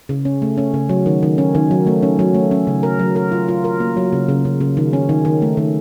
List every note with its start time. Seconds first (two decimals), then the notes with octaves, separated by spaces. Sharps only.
0.09 C#3
0.25 C#4
0.42 A3
0.58 C#4
0.74 C#3
0.89 F#3
1.06 D#3
1.23 D#3
1.38 C#4
1.55 D#3
1.71 F#3
1.87 A3
2.03 C#4
2.19 F#3
2.34 A3
2.51 C#4
2.67 C#3
2.83 A#4
2.99 F#3
3.16 A#4
3.32 F4
3.49 F4
3.64 A#4
3.80 A#3
3.97 F#3
4.13 C#3
4.29 C#3
4.45 C#3
4.61 C#3
4.77 D#3
4.93 C#4
5.09 D#3
5.25 D#3
5.42 A3
5.57 D#3